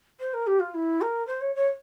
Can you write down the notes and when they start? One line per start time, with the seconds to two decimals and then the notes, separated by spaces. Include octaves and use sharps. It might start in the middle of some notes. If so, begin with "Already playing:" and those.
0.20 C5
0.34 A#4
0.47 G4
0.60 F4
0.74 E4
1.01 A#4
1.27 C5
1.41 C#5
1.55 C#5